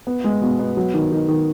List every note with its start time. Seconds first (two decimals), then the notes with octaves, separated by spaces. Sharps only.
0.07 B3
0.24 G#3
0.42 B2
0.59 B3
0.77 F#3
0.94 D#3
1.12 D#3
1.28 D#3